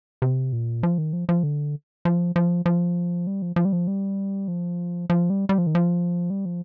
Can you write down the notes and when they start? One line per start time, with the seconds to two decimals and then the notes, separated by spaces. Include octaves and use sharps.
0.22 C3
0.53 A#2
0.83 F3
0.98 D#3
1.13 F3
1.29 F3
1.43 D3
2.05 F3
2.36 F3
2.66 F3
3.27 G3
3.42 F3
3.56 F3
3.65 G3
3.73 F3
3.88 G3
4.48 F3
5.10 F3
5.30 G3
5.49 G3
5.58 F3
5.67 D#3
5.75 F3
6.30 G3
6.45 F3